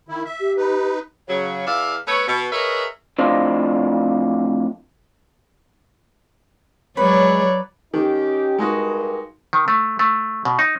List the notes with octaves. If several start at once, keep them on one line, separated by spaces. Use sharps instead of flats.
D#3 E4
E5
G4
D#4 B4
C#3 F#3
E2 D5 E5 F5
A3 B3 B4 C#5
B2
G#4 A#4 B4 C#5 D#5 E5
F2 A2 D4 F4 C5 D#5
F#3 G#3 B4 C#5 D5
D#3 C#4 D#4 G4
G2 G#3 D#4 F#4 A#4
D#3
A3
A3
B2
D#4